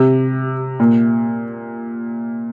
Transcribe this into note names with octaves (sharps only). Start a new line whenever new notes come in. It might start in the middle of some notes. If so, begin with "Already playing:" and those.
Already playing: C3
A#2